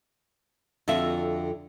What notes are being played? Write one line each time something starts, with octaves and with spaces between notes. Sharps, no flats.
F2 D3 F4 F#4 E5